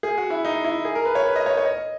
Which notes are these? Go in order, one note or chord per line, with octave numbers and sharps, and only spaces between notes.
G#4
F#4
E4
D#4
E4
G#4
A#4
B4
C#5
B4
D#5
C#5
C#5
D#5